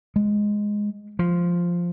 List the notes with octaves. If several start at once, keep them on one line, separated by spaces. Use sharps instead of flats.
G#3
F3